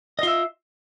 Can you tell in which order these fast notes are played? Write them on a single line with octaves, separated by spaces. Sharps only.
D#5 F4 E5